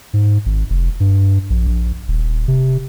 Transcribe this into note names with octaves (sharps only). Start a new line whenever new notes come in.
G#2
G#1
F1
G2
A#1
A#1
D#1
C3